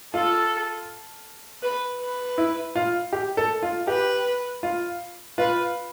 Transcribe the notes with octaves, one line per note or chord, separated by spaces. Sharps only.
F4 A4
B4
B4
E4
F4
G4
A4
F4
G4 B4
F4
F4 B4